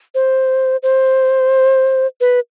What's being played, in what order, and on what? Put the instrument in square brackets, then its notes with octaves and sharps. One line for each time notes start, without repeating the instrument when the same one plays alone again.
[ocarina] C5
C5
B4